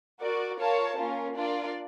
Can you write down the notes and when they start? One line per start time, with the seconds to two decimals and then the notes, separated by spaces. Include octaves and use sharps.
0.22 F#4 A#4 D5
0.60 F4 A#4 C#5 F5 A5
0.99 A#3 C#4 F4 A#4
1.36 D4 F4 A#4 D5